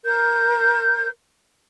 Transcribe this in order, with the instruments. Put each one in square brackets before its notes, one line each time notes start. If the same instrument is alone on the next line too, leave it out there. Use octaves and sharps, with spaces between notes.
[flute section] A#4 G6